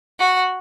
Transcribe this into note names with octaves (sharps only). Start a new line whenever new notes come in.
F#4